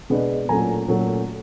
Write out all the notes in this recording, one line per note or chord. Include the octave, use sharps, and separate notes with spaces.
B2 G#3 B3 D4
A#2 F#3 A3 C#4 G#5 A#5
A#2 F#3 A3 C#4